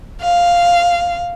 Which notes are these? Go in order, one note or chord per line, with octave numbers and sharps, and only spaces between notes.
F5